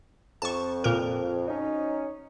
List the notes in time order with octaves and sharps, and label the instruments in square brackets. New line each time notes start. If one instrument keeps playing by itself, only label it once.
[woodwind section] F2 [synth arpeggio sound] A5 C#6
[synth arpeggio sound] A#2 A#4
[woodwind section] F#3 C#4 D#4